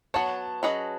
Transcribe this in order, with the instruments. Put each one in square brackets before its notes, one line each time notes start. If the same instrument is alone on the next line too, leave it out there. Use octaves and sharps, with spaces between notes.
[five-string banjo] F#3 B3 F#4 C#5 [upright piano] A5
[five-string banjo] F#3 C#4 G#4 B4 D#5